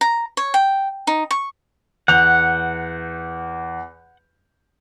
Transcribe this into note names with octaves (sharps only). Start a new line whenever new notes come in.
A#5
C#5
G5
D#4
C#6
E2 F#5 G6 F7